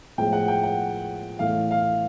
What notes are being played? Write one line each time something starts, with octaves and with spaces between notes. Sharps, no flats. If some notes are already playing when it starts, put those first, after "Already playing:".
A2 F3 G#3 G5
F#5
G5
F#5
A2 E3 A3 F5
F5